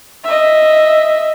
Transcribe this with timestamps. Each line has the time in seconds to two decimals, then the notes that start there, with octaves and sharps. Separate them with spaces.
0.24 D#5 E5